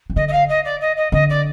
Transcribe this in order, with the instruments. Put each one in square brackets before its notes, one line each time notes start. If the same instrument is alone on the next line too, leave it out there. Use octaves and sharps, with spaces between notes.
[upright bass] D#3
[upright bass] D3 [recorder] D#5
[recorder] D#5
F5
D#5
D5
D#5
D#5
[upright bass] D3 [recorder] D#5
[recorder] D5